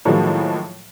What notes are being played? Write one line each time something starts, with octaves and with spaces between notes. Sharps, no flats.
A2 D#3 F3 F#3 G#3 A#3